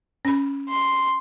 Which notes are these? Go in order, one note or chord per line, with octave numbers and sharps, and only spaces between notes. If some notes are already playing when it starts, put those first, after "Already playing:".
C#4 B5
C6